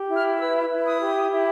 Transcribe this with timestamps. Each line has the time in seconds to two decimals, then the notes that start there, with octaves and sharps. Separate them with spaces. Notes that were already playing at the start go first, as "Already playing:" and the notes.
Already playing: G4
0.08 E4
0.16 F6
0.39 B4 E6
0.70 E4
0.85 D#6
1.01 G4
1.31 E4